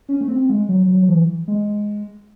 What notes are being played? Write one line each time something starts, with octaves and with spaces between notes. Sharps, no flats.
C#4
A3
C4
G#3
F#3
F#3
F#3
E3
G#3